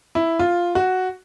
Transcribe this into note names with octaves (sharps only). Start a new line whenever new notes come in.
E4
F4
F#4